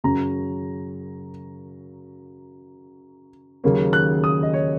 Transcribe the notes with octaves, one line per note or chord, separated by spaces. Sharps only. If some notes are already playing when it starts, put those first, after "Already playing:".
F#2 C#3 F#3 C#4 A#5
D#2 C#3 F#3 A#3 C#4
F#6
D#6
D#5
C#5